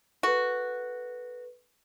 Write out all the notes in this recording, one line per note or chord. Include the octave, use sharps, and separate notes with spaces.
F#4 A4 B4